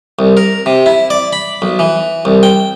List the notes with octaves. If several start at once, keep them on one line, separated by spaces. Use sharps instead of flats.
C2
A#4
C3
E4
D5
B5
B1
E3
C2
G5